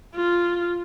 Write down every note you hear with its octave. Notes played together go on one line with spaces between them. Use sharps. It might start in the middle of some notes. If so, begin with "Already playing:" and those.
F4